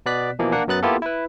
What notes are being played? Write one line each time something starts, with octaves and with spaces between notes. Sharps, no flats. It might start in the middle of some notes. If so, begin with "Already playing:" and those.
B2 B3 D5 F#6 B6
B2 E3 F3 A#3
A#3 D4 F#5
F#2 F#3 B3 F#6 A6
A#3 B3 E4 F4 G4 A4
E4 B4